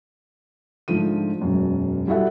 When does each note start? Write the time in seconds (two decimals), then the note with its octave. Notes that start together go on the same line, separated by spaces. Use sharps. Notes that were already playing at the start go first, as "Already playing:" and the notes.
0.88 G#2 D3 F3 A3 D#7
1.41 E1 F#2
2.07 G3 E4 F#4 A4 E5 F#5